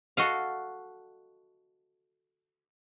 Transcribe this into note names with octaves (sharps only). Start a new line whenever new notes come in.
F#4 A4 D#5 F5